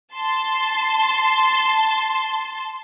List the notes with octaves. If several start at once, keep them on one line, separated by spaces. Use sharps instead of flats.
A5 C6